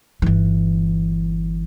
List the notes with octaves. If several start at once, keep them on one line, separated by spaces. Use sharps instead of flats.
G1 E3